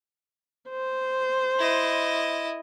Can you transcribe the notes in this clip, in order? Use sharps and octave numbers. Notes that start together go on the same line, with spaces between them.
C5
E4 D#5